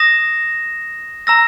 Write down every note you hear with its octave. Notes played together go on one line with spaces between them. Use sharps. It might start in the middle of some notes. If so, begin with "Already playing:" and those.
Already playing: D#6 A#6 E7
A#5 E6 A#6